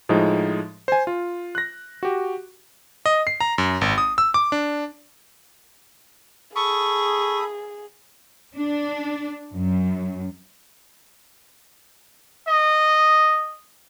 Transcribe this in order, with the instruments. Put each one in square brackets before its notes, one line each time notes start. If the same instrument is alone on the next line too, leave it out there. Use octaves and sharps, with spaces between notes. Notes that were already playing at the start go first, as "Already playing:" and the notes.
[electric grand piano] A2 F3 G#3 D#4
C5 G#5
F4
F#6 A#6
F#4 G4
D#5
C7
A#5
F#2
G#1
D#6
E6
D6
D4
[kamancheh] G#4 [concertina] A4 B5 D#6 [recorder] C#6
[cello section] D4
F#2
[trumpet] D#5